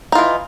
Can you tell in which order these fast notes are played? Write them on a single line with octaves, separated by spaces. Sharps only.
D#4 F4 E3